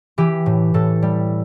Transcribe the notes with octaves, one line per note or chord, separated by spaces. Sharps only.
E3 G4
A2
A2 A4
G3